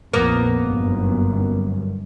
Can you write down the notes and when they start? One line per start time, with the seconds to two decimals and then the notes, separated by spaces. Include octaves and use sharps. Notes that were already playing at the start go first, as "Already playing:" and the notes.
0.13 A#1 F2 A#3 B3 A#4
0.61 G1 F#2